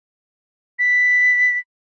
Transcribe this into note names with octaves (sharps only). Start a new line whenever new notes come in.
B6